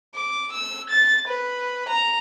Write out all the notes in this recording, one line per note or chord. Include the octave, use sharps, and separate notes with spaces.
D6
E6
A6
B4
A#5